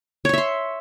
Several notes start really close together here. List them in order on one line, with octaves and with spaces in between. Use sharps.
C#5 C#6 E5 C6